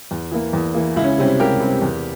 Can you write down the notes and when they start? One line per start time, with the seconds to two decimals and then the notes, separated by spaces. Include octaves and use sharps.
0.11 E2
0.31 E3 A#3
0.53 E2
0.75 E3 A#3
0.96 C#2 E4
1.04 C#4
1.18 C3 G3 C4 C#4
1.40 C#2 G4 A#4
1.60 C3 G3 C4
1.82 E2